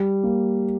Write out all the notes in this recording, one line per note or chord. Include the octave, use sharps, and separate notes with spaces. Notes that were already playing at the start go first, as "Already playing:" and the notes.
Already playing: G3
A#3